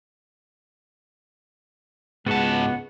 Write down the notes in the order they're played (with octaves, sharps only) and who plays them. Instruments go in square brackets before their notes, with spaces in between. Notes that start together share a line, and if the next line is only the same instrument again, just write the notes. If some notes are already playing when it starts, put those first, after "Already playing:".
[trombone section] C#2 G#3 [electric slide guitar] G#2 A5 [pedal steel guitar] B3 F#4